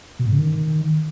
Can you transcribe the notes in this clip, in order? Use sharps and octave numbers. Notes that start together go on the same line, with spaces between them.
B2
G#2
C#3
D#3